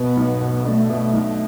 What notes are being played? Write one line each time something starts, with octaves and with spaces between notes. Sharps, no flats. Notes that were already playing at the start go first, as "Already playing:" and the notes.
Already playing: B2 B3
B1
B2
A3 D4
B2
B1